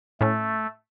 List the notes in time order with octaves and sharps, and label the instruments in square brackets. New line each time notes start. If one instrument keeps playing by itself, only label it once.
[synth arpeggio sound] A2 C#4 [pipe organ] A3